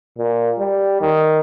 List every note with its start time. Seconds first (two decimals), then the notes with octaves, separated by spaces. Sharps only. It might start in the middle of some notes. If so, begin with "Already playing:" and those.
0.18 A#2
0.58 G3
1.01 D#3